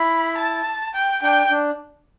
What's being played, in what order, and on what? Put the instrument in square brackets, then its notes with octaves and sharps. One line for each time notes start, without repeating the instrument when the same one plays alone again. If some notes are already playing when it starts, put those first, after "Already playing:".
Already playing: [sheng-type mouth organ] E4 [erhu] B5
[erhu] A5
G5
[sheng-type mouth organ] D4 [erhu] G5
[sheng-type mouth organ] D4